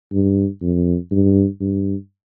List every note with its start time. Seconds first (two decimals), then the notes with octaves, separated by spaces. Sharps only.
0.12 G2
0.62 F2
1.11 G2
1.60 G2